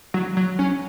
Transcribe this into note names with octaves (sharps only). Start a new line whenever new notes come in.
F#3
F#3
C#4